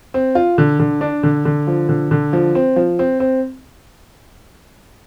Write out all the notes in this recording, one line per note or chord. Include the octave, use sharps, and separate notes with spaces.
C4
F4
D3
D3
D4
D3
D3
F3
D3
D3
F3
C4
F3
C4
C4